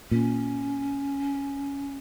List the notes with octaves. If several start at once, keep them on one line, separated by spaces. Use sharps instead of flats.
A#2 C#4